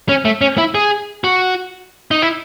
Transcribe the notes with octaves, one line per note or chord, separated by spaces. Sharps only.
C#4
A3
C#4
E4
G#4
F#4
D#4
E4